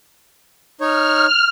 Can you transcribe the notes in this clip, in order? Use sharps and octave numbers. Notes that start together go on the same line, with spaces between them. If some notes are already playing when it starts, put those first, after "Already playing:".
D#4 C#5 F6